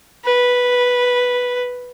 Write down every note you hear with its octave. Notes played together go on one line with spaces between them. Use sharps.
B4